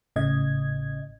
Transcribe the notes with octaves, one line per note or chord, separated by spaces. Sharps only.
G#1 A2 C#3 D#5 G#6